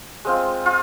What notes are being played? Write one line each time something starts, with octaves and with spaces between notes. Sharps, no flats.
G#3 C4 F4
F4